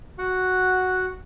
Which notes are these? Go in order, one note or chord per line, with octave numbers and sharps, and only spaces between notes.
F#4 F#5